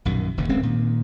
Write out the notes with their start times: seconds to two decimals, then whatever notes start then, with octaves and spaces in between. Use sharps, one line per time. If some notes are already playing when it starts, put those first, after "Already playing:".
0.05 A#1 F#2 B2 D#3
0.37 E1 D#2 C#3
0.49 D1 G#3 C4 C#4
0.63 A#2 D#3